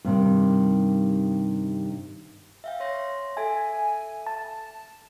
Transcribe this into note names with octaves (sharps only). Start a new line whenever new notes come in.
G2 C3 D#3
E5 F5 G5
C#5 C6 A#6
A4 E5 G#5
A5